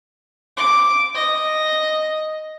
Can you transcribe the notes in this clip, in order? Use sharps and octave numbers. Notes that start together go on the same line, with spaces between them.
D6
D#5